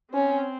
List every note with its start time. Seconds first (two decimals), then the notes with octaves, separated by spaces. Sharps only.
0.14 C4 C#4